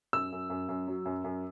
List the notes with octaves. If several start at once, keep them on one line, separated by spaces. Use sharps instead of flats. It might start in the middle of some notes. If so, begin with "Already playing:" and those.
F#2 E6
F#2
F#2
F#2
F#3
F#2
F#2